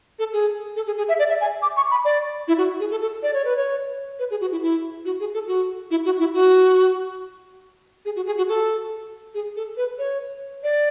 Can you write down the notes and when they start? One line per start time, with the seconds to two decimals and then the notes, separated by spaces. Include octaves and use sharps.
0.19 A4
0.33 G#4
0.76 A4
0.87 G#4
0.98 G#4
1.09 E5
1.19 D5
1.29 E5
1.41 G#5
1.62 D6
1.77 C#6
1.91 B5
2.05 D5
2.48 E4
2.58 F#4
2.80 G#4
2.91 A4
3.01 A4
3.23 D5
3.34 C#5
3.45 B4
3.57 C#5
4.19 B4
4.31 G#4
4.41 F#4
4.52 E4
4.62 E4
5.05 F#4
5.20 G#4
5.34 A4
5.48 F#4
5.91 E4
6.05 F#4
6.20 E4
6.34 F#4
8.05 G#4
8.16 F#4
8.26 G#4
8.37 F#4
8.49 A4
9.35 G#4
9.56 A4
9.77 B4
9.99 C#5
10.63 D5